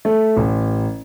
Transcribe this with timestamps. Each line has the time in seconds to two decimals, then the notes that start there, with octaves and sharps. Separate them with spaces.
0.05 A3
0.37 A1